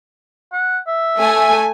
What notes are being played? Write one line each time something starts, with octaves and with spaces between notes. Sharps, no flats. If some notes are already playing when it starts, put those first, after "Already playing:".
F#5
E5
A3 G#5